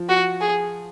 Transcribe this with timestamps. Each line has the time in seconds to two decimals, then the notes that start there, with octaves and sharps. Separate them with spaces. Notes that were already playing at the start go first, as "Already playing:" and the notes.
Already playing: F3
0.09 F#4
0.41 G#4